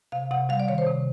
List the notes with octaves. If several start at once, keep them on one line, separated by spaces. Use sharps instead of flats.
C3 F5
C3 F#5
G3 F5
D5
D#3 C#5
C5
C3